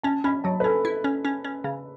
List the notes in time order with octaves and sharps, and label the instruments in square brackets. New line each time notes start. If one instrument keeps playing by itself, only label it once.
[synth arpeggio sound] C#4 [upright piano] A5
[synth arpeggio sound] C#4 [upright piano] B5
[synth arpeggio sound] F#3 [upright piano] A5
[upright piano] B4
[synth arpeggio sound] C#4 [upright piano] A4
[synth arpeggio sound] E4
C#4
C#4
C#4
C#3